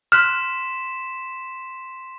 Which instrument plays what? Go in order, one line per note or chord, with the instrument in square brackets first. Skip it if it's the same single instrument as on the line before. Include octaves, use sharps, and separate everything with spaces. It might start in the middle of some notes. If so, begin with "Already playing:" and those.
[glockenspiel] C6 B6 E7 [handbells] F6 F#6